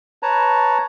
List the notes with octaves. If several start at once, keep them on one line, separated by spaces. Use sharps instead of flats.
B4 C#5 A5 A#5